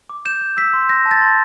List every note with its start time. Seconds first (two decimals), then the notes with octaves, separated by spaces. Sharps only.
0.10 D6
0.25 G6 E7
0.41 G6
0.57 E6 B6
0.73 C6
0.89 G6 A#6
1.06 A5
1.11 A6
1.21 C6